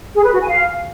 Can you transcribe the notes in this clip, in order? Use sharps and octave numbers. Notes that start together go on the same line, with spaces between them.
G#4
B4
F#4
G#5
F5